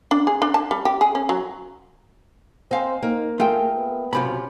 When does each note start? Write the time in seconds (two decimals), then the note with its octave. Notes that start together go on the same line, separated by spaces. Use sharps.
0.11 D4
0.27 G#4
0.42 D4
0.54 A5
0.71 G3
0.85 G4
1.01 G#4
1.15 C#4
1.29 F#3
2.71 C4 C5 D#5 F5 G#5
3.03 A#3 D#4 A#4
3.40 A3 F4 G#4 A#4 G5
3.77 B3
4.13 B1 C3 C#4 F4 B5